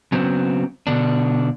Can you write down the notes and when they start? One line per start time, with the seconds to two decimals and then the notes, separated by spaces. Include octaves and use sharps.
0.12 C#3 F#3 B3 C4
0.87 B2 D3 D4